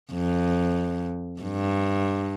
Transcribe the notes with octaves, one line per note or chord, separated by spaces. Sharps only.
F2
G2